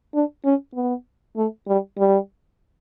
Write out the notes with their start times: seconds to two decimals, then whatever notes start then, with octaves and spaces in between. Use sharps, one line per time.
0.14 D4
0.45 C#4
0.75 B3
1.36 A3
1.68 G3
1.98 G3